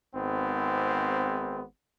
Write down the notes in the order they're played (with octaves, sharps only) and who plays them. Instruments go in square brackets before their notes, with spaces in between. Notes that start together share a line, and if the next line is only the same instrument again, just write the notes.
[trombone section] G#1 G#2 B3 C4